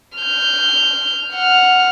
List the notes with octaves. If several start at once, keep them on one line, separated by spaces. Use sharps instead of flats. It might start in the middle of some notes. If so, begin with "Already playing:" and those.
F6 G6
F#5 F6